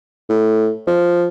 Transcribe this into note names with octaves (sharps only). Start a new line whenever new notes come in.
A2
F3